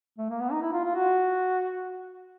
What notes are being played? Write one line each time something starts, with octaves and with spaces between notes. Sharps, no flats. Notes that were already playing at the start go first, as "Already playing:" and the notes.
A3
A#3
B3
D#4
E4
F4
F4
F#4